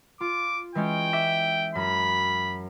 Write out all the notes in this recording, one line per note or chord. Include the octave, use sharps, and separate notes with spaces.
F4 D6
E3 G#3 C#4 G5
E5 D6 B6
F#2 B5